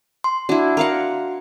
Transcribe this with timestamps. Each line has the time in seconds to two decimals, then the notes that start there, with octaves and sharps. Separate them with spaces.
0.24 C6
0.49 D4 E4 F#4
0.77 A#4 F5 F#5